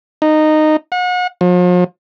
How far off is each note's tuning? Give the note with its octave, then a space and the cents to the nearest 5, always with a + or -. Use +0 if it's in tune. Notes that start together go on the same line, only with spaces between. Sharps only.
D#4 -15
F#5 -35
F3 +40